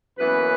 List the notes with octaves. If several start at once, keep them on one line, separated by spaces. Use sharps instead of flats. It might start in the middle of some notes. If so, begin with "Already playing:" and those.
F#2 E3 A#3 B3 C#4 B4